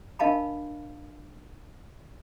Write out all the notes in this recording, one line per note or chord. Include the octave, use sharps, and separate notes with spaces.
D4 A#4 D#5 F5 A5 B5